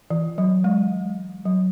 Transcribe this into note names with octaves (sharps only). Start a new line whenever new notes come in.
E3
F#3
G#3
F#3